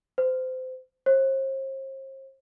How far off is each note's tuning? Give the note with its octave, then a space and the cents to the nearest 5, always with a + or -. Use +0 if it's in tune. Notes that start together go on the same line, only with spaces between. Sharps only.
C5 -25
C5 +40